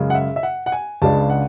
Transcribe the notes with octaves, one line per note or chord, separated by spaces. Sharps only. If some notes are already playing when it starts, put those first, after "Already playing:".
Already playing: F#2 C#3 G#3
F#5
E5
E5
F#5
F#5
G#5
C#2 C#3 G#3 D4 A5
F#5